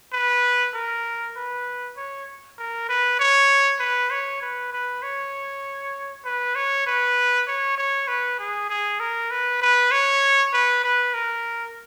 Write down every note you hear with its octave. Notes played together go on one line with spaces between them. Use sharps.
B4
A#4
B4
C#5
A#4
B4
C#5
B4
C#5
B4
B4
C#5
B4
C#5
B4
C#5
C#5
B4
G#4
G#4
A#4
B4
B4
C#5
B4
B4
A#4